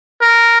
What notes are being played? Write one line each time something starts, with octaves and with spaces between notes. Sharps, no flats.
A#4